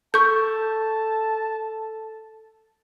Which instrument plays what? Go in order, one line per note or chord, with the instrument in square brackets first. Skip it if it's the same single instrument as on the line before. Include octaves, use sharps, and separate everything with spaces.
[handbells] A4 [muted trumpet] A5 [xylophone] C#6 G6